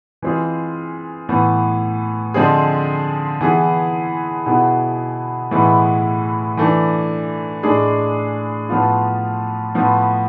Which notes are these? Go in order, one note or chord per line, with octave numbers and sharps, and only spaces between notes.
E3 G#3 C4 F4 G#4
A2 E3 B3
D3 F3 G#3 C4 G#4
E3 B3 E4 G#4
B2 B3 E4 G#4
A2 E3 G#3 B3 E4
E3 A3 D4
A2 G#3 D4 G#4
A2 F3 B3 F4
A2 F3 B3